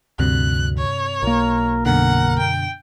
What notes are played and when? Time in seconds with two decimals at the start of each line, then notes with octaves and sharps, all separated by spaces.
0.19 D2 G2 C3 F#6
0.78 C#5
1.23 B1 A#3 A#4
1.86 F#2 B2 D3 A#4 F#5
2.39 G5